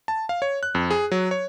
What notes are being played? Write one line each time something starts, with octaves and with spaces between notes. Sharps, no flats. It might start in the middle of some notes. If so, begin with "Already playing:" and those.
A5
F5
C#5
F#6
F2
G#4
F#3
C#5